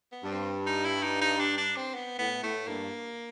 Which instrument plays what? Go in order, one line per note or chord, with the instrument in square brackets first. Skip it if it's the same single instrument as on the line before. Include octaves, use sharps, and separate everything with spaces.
[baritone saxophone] B3
[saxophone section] G2
[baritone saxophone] C4
D#4
E4
D#4
D#4
D4
D4
C4
B3
[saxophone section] A2 [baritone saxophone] B3
[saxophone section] A2 [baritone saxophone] A3
[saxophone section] G2 [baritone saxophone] A#3